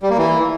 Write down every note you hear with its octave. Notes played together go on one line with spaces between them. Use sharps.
G3
A#3
E3